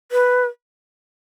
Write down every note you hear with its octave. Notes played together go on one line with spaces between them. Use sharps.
B4